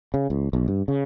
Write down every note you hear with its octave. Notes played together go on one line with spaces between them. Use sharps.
C#3
C#2
B1
G2
C#3